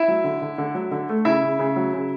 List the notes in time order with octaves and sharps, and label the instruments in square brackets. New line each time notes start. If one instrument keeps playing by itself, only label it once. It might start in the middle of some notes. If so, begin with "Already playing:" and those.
Already playing: [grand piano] E4 E5
F#3
D3
D3
D3
F#3
D3
A3
C#3 E4 E5
C#3
C#3
F#3
C#3